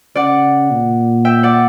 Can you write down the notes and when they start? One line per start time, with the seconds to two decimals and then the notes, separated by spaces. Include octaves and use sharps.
0.15 C#3 D5 F#5
0.71 A#2
1.25 E5 G5
1.43 D5 F#5